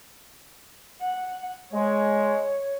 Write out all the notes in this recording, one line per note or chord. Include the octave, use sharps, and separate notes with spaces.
F#5
G#3 C#5